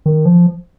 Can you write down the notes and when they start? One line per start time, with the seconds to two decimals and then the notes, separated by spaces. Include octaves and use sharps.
0.06 D#3
0.25 F3